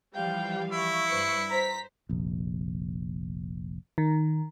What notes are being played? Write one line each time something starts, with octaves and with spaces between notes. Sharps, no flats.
E3 F3 G3 F5 G5
E4 C#6
G2 B4 C5 B5 C#7
C5 A#5 B6
F1 A#1
D#3